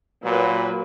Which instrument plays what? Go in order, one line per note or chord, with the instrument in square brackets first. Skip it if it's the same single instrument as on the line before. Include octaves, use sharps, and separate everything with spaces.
[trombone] A#2 [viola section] F#3 B4